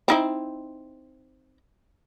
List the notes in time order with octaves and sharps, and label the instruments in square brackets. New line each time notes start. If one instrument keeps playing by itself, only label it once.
[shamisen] C4 D#4 E4